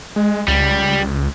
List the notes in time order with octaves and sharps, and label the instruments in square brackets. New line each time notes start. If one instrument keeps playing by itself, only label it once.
[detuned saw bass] G#3
[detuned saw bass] C#2 [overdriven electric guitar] G3